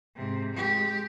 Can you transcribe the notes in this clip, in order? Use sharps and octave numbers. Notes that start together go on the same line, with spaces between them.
G#2 C3
G#3 G4